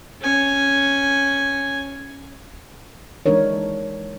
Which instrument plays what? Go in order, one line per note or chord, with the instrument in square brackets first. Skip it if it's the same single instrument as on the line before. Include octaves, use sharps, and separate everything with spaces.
[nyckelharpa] C#4 G#5
[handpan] E3 G#3 D4 D#4 A#4 C#5